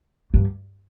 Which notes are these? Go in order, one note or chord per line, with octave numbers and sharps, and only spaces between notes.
G2